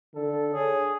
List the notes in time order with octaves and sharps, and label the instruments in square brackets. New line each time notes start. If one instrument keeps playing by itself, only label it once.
[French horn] D3 [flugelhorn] A4
[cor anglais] G#4 [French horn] C#5